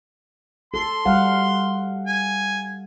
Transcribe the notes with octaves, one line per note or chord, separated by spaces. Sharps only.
A4 C6
G3 F5 F#5
G#5